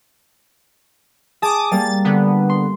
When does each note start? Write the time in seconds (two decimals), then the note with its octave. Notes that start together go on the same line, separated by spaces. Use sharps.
1.42 G#4 A5 D6 D#6
1.71 G3 A#3 A6
2.04 D3 B3
2.50 C6